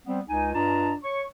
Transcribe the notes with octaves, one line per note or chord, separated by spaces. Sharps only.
G3 B3 C4
C#2 D#4 G#5
G2 D4 F4 D#5 A5 A#5
C#5 C#6